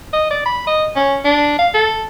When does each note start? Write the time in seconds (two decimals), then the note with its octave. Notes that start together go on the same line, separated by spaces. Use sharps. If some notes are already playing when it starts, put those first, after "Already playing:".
0.13 D#5
0.31 D5
0.46 B5
0.67 D#5
0.96 C#4
1.25 D4
1.59 F5
1.74 A4